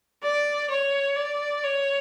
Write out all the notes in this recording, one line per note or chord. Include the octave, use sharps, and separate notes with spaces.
D5
C#5
D5
C#5